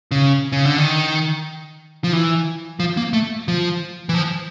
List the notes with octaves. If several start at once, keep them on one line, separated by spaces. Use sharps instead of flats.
C#3
C#3
D3
D#3
F3
E3
F3
A#3
A3
F3
E3
F3